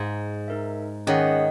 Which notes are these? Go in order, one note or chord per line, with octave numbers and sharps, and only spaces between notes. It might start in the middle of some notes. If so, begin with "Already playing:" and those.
Already playing: G#2
D#4 A#4 E5
D#3 C#4 G#4 C#5 F#5